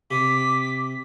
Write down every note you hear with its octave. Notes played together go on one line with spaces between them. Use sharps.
C3 D6 B6